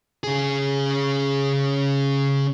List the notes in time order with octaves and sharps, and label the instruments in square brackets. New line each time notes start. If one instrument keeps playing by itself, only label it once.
[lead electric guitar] C#3 G#4